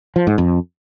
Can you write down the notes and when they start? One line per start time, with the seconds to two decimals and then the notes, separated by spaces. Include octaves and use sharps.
0.16 F3
0.27 G#2
0.38 F2